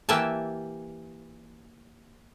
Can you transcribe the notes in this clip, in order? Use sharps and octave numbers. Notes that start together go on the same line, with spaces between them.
E3 A#3 G4 E5 G#5 A5